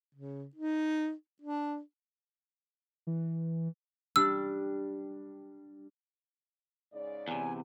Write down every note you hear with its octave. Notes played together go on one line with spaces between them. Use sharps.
C#3
D#4
D4
E3
G3 D4 E6
G#2 C#3 D5
E2 C3 G#5